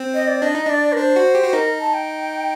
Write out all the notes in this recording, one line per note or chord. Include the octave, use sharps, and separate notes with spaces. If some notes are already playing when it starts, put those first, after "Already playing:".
Already playing: C4
D#5
D5
D4 D#5
D#4
D4 D5
A#4
D4 C5
F#4
G4
F#4
D#4 A#4
A5
G5